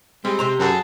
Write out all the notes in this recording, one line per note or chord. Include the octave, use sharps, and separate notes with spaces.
G3 G#3 C4
C3 C5 A#5
F#2 F#3 F#4 G#4 A4